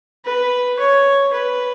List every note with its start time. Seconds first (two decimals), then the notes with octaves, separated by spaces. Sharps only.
0.25 B4
0.79 C#5
1.33 B4